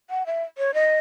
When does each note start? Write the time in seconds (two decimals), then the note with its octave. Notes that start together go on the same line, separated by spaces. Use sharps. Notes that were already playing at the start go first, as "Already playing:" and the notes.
0.10 F#5
0.26 E5
0.58 C#5
0.74 D#5